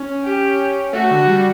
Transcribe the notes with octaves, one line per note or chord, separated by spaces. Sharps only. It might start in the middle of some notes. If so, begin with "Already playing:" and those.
Already playing: C#4
G4
A3 F#4
D3
G3